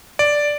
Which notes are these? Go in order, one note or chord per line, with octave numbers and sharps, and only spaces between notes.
D5